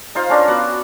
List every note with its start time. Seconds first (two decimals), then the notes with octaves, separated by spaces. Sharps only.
0.15 D#4 F4 C5 F5
0.30 C#4 D4 A#4 D5
0.48 B3 F#4 F#5